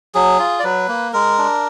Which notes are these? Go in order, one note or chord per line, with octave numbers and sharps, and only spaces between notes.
F#3 G#4
F4
D5
F#3 B4
A#3
G#3 A#4
D4